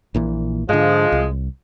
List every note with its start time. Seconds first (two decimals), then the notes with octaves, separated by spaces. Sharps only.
0.14 A#1 A#2 E3
0.69 G#2 D3 F3 G#3
1.12 C2